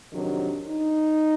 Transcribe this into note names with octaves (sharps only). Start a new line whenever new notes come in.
F2 C3 D#3 F#3 D4
D#4